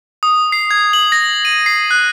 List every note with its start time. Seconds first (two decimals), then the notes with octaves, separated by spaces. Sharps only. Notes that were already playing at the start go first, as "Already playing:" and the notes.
0.23 D#6
0.52 C7
0.71 G#6
0.93 F#7
1.12 A#6
1.45 D#7
1.66 C7
1.91 F#6